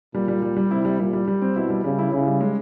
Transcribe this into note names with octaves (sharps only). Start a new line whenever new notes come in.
A#2 G3
G3
G3
G3
C3 E4
G3
A#2 G3
G3
G3
C4
B2 E4
G3
C#3 G3
E4
C#3 E4
G3
G#3